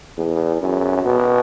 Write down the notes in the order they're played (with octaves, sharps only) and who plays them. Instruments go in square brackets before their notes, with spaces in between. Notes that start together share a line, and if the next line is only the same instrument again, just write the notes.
[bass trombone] E2
F#2
B2